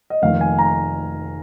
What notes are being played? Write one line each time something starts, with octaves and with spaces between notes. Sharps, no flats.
D#5
F1 F2 D#3 A#3 F5
G#5
A#5